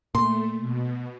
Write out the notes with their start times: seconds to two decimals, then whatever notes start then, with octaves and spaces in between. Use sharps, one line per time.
0.15 A#2 A3 C6
0.59 B2